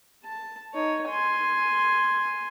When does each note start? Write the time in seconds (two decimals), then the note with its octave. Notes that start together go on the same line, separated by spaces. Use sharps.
0.24 A5
0.74 D#4 C#5
1.09 G#5 C6